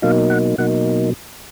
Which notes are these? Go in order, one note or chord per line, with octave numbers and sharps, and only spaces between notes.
B2 F#3 A#3 D#4 F5
F#5
B2 F#3 A#3 D#4 F#5